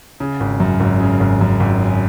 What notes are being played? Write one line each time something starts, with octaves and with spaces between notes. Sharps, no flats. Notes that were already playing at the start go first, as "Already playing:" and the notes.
C#3
G#1
F#2
G#1
C#3
G#1
F#2
G#1
C#3